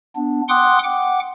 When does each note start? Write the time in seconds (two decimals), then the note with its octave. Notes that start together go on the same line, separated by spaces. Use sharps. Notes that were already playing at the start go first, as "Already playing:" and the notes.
0.16 B3 D4
0.49 F#5 G5 C6 D6 D#6 F#6
0.84 F#5 G5 D6